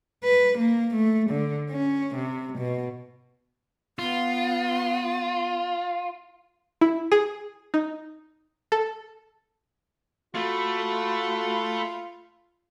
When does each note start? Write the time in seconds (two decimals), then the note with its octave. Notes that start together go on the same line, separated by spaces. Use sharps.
0.24 B4
0.59 A#3
0.96 A3
1.31 D3
1.70 C#4
2.16 C3
2.58 B2
3.99 B3 F4
6.81 E4
7.12 G#4
7.74 D#4
8.72 A4
10.35 A3 F4 F#4 B5